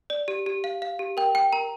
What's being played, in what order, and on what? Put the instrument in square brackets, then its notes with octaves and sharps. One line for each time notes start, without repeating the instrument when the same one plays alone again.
[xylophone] D5
G4
G4
F5
F5
G4
A#4 G5
G5
A#4 A#5